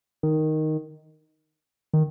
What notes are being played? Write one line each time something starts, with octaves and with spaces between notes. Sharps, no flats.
D#3
D#3